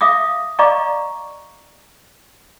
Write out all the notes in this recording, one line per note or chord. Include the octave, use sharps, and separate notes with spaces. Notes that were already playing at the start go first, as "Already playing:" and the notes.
E5 F5 D6 D#6
D5 D#5 F5 A#5 C#6 D6